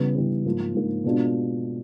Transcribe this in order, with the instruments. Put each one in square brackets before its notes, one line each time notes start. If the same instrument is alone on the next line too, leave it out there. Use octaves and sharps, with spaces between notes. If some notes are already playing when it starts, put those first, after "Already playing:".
Already playing: [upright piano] C#3 E3 G3 B3
C#3 E3 G3 B3
G#2 F3 A#3
G#2 F3 A#3
B2 G#3 B3 D4 F4